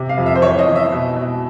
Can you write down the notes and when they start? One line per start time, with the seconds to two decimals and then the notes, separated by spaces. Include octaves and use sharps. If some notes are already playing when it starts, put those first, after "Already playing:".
Already playing: C3
0.09 F5
0.18 F2
0.26 E5
0.36 C5
0.42 E3 C#5
0.59 D#5
0.67 E3
0.76 E5
0.92 B2
1.16 B2